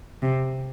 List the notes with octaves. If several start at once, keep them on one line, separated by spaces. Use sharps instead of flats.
C3